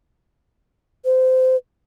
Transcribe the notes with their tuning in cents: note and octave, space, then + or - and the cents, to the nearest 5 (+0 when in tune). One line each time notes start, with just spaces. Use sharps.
C5 -25